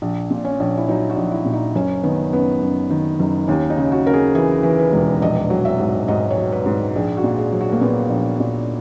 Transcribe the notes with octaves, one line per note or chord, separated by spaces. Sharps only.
A#1
A#2
C#4
A#1
E4
F#3 D#4
F#4
A#1
E4
A#2
D#4
F#1 C#4
D#3 B3
F#2 B3
F#2
D#3
F#1
D#2 C#4
D#4
C#3
F#4
C#3 A#4
G#4
E3 G#4
E3
B4
E1
A#1 D#5
F#3
E5
G#2
G#2 D#5
C#5
F#3
B4
G#2
A#1 G#4
F#4
A#2
G#4
F#3
F#4
A#3
A#2 B3
A#1
A#2